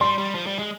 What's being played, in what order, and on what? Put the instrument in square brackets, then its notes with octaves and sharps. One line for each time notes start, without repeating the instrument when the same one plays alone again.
[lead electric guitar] G3 [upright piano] C6
[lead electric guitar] G3
F3
G3
G#3